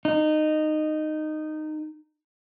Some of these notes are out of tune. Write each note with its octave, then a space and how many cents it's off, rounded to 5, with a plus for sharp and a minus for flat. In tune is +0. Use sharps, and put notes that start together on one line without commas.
D#4 -15